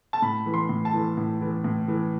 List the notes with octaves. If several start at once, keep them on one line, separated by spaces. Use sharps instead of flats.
A5
A2 B5
E3
C6
A2
A5
E3
A2
E3
A2
E3